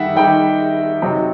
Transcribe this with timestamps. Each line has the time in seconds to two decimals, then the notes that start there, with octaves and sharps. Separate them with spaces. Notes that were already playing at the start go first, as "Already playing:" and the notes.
Already playing: D#3 G3 D#4 E5 F#5
0.16 D#3 G3 D#4 G5
1.02 C3 F#3 C4 D#4